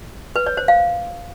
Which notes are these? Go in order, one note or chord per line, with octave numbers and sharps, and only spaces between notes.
B4
C#5
C5
F5